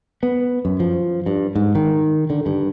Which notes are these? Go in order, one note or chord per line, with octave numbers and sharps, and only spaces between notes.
B3
F#2
F3
G2
G#2
D#3
D3
G2